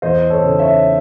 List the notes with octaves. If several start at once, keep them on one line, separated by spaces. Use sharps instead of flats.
E2 C5 D#5
A4 C#5
C#3
C#5 E5